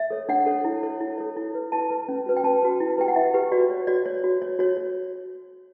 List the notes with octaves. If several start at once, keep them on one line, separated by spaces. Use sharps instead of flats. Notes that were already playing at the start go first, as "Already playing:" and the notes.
Already playing: E5
A4 C#5
D4 F#5
A4 C#5
E4
A4 C#5
E4
A4 C#5
E4
B4
E4 A5
B4
C#4
F#4 B4
G5
C#4 A5
F#4 B4
E4
G4 B4 G5
F#5
E4 E5
G4 B4
F#4 D5
C#5
F#4 D5
C#5
F#4
C#5
F#4 C#5
C#5